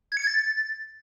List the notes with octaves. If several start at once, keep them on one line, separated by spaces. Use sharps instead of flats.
G#6
C#7
G#6
A6